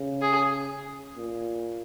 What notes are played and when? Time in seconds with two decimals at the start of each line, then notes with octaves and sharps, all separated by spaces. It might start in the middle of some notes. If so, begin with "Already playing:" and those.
Already playing: C#3
0.22 G#4
1.17 A#2